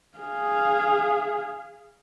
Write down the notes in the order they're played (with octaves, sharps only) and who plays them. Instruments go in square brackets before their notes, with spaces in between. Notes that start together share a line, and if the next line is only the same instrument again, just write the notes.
[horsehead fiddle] G#4 F5